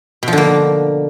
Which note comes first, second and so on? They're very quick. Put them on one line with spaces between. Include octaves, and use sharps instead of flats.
B2 F3 D3 A#3